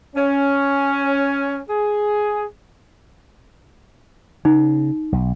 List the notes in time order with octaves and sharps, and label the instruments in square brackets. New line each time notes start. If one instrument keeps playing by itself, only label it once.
[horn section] C#4
G#4
[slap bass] C#3 [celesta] D#4
[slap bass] B1